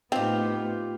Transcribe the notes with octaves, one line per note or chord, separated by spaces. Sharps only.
A2 B3 C4 D#4 F4 G4